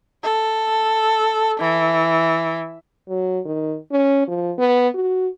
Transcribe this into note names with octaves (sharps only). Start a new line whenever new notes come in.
A4
E3
F#3
D#3
C#4
F3
B3
F#4